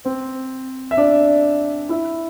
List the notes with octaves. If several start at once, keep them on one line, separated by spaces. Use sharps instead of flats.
C4 C5
E5
D4 D5
E4 E5